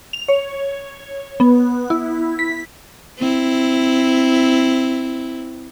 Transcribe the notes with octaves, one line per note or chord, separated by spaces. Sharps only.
F7
C#5
B3
E4
B6
C4 E4